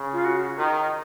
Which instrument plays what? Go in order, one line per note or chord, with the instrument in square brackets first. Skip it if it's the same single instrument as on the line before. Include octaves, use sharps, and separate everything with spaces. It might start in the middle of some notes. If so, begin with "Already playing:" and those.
Already playing: [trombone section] C#3
[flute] F4
F#4
[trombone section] D#3